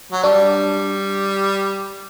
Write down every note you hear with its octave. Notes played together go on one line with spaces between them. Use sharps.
F#3
G3 D4